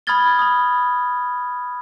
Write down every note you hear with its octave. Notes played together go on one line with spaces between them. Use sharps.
B5 D#6 F6 G#6 A6 G7
B5 D#6